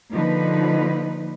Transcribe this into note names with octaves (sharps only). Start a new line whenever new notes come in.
D3 F3 A#3 D#4 B4